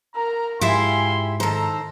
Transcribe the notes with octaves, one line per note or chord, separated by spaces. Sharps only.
A#4 A#5
G#2 E4 F4 G4 E5 G#5 C6
D#3 A4 C5 A#5